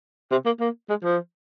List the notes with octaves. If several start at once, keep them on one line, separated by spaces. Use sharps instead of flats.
C3
A#3
A#3
G#3
F3